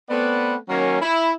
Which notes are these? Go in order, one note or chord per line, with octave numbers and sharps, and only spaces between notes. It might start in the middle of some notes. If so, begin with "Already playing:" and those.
A3 B3 C4 B4 D5 F#5
D#3 F#3 A#3 C#4
E4